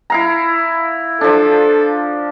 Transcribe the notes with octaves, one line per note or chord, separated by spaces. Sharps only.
E4 F5 A#5
F3 D4 A4